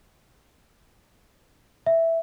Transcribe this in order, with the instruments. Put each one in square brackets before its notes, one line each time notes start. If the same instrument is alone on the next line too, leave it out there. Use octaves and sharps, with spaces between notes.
[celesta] E5